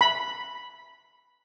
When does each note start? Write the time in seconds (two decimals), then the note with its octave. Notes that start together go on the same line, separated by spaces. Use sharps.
0.01 B5